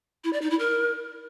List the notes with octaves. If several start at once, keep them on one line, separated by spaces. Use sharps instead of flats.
E4
D5
D#4
E4
A#4